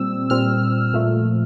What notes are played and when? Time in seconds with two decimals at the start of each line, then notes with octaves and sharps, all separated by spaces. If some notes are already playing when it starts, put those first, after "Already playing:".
Already playing: A#2 G3 C4 E6
0.30 A#2 G3 C4 F6
0.94 A#2 F3 A3